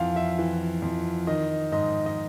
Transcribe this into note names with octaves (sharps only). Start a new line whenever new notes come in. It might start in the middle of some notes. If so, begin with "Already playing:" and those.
Already playing: F2 E3 F5 F#5
E5
E3
F2
D#3 D#5
G#2 D#5
D#5